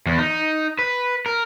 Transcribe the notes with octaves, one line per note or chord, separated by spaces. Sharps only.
E2
D#4
B4
A#4